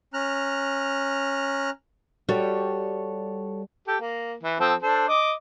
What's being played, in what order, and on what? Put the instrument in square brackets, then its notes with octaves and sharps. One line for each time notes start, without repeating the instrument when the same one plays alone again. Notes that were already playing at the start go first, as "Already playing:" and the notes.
[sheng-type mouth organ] C#4 A#5 F6 F#6
[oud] G3 [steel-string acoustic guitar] F#4 A4 C#5
[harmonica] G4 A4
A#3
E3
F3 C4 A4
D4 A4 C5
D#5 D6